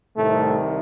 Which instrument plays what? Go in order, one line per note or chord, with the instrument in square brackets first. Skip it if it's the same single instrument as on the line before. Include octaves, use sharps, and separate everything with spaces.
[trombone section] C2 A2 C3 D#3 A3